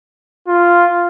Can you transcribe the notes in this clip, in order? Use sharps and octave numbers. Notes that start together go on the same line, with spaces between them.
F4